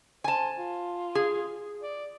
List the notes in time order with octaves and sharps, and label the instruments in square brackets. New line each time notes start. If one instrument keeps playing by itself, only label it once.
[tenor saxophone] C5 [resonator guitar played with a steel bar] G#5 A5
[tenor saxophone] F4
[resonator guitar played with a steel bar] G#4
[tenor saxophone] D5